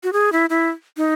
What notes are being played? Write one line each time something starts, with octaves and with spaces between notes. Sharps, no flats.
F#4
G#4
E4
E4
D#4